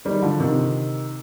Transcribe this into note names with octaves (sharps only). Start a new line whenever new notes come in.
D#3 G3
D3 F3
C3 D#3